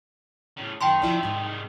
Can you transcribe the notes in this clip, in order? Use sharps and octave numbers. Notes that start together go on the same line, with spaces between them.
A2 C#3
F#2 A#2 D#3 G5 A5 C6
C3 D#3 F3 E4 D5
G#2 G#3